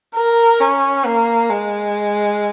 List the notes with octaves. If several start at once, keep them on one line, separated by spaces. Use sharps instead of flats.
A#4
C#4
A#3
G#3